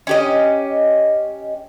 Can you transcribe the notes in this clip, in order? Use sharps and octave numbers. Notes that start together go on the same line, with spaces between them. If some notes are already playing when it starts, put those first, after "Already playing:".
C#4 G4 D#5